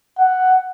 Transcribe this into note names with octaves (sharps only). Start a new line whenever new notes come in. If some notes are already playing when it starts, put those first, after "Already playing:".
F#5